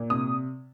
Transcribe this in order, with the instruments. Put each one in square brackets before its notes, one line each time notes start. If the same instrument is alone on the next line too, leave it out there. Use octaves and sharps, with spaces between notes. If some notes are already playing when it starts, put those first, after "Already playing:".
Already playing: [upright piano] A#2
C3 D#6